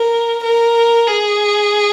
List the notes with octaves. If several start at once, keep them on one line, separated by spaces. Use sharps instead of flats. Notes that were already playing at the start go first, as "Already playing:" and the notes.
Already playing: A#4
A#4
G#4